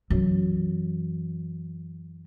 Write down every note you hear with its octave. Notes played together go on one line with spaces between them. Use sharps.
F#2 E3